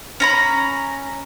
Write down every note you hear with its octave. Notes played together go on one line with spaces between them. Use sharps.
C#4 A#5 B5